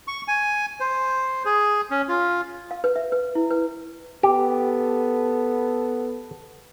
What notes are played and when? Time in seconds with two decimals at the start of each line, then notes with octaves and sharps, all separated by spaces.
0.08 C#6
0.28 G#5
0.80 C5
1.45 G#4
1.91 C#4
2.08 F4
2.71 F5
2.84 B4
2.96 E5
3.12 B4
3.35 E4
3.51 B4
4.23 B3 G4 A4